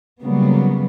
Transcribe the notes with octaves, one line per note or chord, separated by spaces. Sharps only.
C#3 F#3 G3 A#3 B3